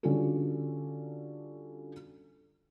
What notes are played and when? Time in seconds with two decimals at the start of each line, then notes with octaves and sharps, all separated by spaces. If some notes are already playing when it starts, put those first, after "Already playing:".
0.03 D3 G3 C#4 F4 F#4 A4